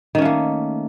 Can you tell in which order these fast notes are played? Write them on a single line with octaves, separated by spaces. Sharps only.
D#3 C#4 A3 A#3